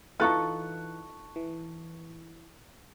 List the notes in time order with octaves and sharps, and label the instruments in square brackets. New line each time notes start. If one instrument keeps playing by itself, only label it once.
[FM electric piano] E3 [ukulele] D#4 F4 A4 [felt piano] A5 C#6 F#6
[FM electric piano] E3